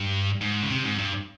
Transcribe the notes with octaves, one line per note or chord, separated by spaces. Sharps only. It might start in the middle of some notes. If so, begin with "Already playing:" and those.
Already playing: G2
G#2
C#3
C3
G#2
G2